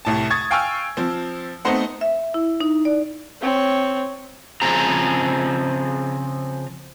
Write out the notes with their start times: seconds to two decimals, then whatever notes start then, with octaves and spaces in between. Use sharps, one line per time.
0.05 C2 A2 A5
0.30 C#6 D#6 G#6 A6
0.51 F5 G5 G#5 C#6 E6 F6
0.97 F3 C4
1.65 A3 B3 C4 D#4 C5 F#5
2.01 E5
2.34 E4
2.60 D#4
2.85 D5
3.42 C4 C#5
4.62 C#3 F3 C4 G#4 A#5